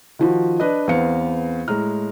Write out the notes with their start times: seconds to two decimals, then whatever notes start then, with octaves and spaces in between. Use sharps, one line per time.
0.19 D#3 F3 F#4
0.60 D4 B4 D#5
0.88 E2 B3 C4 C5 F5 C#7
1.68 A2 G#3 A#5 F6